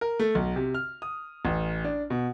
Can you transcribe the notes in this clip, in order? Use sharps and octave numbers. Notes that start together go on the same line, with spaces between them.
A#4
A3
B1
C3
F6
D#6
A1
D4
B2